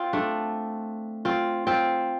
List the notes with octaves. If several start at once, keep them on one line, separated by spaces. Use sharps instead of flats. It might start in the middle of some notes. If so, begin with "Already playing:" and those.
Already playing: C4 F4
A3 D4
C4 F4
C4 F4